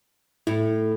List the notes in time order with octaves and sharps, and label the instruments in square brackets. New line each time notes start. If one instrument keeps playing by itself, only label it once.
[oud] A2 [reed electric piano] E4